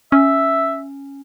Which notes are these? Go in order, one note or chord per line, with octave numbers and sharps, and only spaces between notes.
C#4 E5